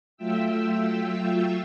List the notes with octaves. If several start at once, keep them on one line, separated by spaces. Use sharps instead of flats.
F#3 A3 F4 E5 G5 E6